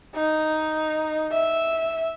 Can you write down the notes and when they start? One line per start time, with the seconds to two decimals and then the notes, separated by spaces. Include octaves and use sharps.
0.15 D#4
1.32 E5